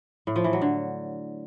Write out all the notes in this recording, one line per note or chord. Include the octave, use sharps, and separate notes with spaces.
A2
F3
E3
F#3
D3